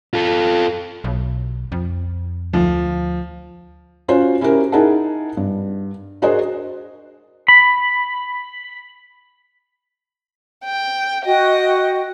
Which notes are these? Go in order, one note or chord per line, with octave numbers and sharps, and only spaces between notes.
F4 A4
B1
F2
D2 F3
C#4 F4 F#4 C5
C#4 E4 F#4 G4 A#4
D#4 E4 G#4 A#4 F#5 A5
G2
D4 F#4 G#4 A#4 C5 D#5
B5
G5
F#4 D#5 G5